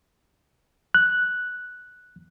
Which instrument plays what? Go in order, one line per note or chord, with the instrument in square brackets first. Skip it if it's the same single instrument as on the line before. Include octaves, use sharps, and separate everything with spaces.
[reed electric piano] F#6